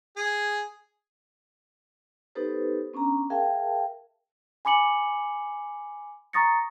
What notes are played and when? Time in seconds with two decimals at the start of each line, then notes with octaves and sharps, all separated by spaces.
0.17 G#4
2.35 B3 D#4 G4 A4 B4 C5
2.93 B3 C#4 D4 A#5
3.30 G#4 A#4 E5 F5 G5 A5
4.65 G#5 B5 D6 C#7 F#7
6.33 A#5 C#6 D#6 A6 A#6 C#7